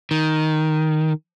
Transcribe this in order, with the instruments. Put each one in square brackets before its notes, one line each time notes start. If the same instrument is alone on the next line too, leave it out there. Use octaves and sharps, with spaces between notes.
[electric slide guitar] D#3